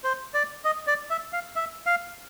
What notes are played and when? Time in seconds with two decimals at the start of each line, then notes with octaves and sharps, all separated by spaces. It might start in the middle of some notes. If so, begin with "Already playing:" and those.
0.04 C5
0.34 D5
0.65 D#5
0.87 D5
1.10 E5
1.33 F5
1.56 E5
1.86 F5